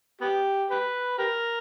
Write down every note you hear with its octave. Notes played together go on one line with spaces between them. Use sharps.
B3 G4
G4 B4
G4 A#4